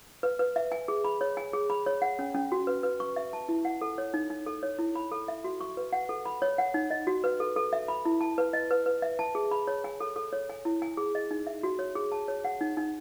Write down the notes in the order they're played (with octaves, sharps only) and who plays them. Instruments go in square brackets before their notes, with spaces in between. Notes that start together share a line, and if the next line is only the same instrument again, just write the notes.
[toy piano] B4
B4
E5
G#5
G#4
B5
C#5
G#5
G#4
B5
C#5
F#5
C#4
C#4
F#4
B4
B4
C#6
E5
A5
E4
F#5
A4
C#5
D#4
D#4
A4
C#5
E4
B5
A4
E5
F#4
C#6
B4
F#5
A4
B5
C#5
F#5
D#4
D#5
F#4
B4
A4
A4
E5
B5
E4
A5
B4
D#5
B4
B4
E5
A5
G#4
B5
C#5
G#5
A4
A4
C#5
G#5
E4
G#5
G#4
D#5
D#4
E5
F#4
C#5
G#4
A5
C#5
F#5
D#4
D#4